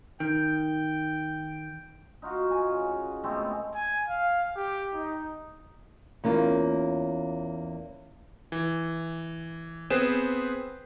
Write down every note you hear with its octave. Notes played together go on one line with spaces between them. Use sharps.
D#3 G5
D#4 F4 F#4 F5
G#5
C#3
G#3 A3 B3 C4
G#5
F5
G4
D#4
E2 A#3 C#4 F4 G#4
E3
B3 C4 G#4 B4 C5 E7